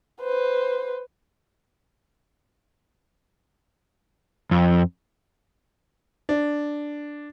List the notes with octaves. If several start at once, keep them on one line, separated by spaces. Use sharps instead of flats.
B4 C5
F2
D4